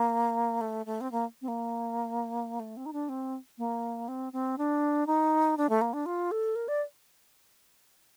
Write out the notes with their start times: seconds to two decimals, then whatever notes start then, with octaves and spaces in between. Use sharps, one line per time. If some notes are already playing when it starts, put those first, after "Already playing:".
Already playing: A#3
0.61 A3
0.86 A3
1.01 C4
1.12 A#3
1.42 C4
1.48 A#3
2.60 A3
2.77 C4
2.86 D#4
2.93 D4
3.09 C4
3.58 A#3
4.08 C4
4.33 C4
4.58 D4
5.07 D#4
5.57 D4
5.69 A3
5.81 A#3
5.93 D4
6.06 F4
6.31 A4
6.56 A#4
6.68 D5